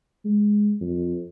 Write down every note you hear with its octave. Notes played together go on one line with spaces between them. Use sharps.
G#3
F2